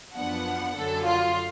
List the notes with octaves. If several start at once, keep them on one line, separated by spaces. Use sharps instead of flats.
F#2 F3 B3 D4 F#5
F#2 D3 F#3 A4
F4